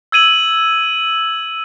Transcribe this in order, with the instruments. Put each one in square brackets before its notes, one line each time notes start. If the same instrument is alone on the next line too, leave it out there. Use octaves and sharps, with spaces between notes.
[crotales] E6 G#6 D#7 F#7